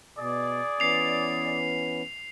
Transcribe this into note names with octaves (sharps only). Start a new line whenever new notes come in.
B2 G#4 D5
E3 B3 C#4 C7 F7